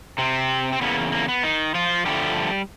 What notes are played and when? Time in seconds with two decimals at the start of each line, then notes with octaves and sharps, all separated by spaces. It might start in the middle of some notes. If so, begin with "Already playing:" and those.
0.18 C3 C4
0.73 C4
0.81 E2 C#3 A#3 B3
1.12 A#3
1.28 B3
1.43 D#3 D#4
1.75 F3 F4
2.05 G2 D3 F3 G3 A3 G4